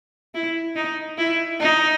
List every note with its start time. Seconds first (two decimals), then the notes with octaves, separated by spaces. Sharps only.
0.34 E4
0.76 D#4
1.18 E4
1.60 D#4